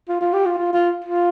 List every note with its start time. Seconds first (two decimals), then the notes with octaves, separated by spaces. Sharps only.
0.09 F4
0.21 F4
0.34 G4
0.46 F4
0.58 F4
0.73 F4
1.04 F4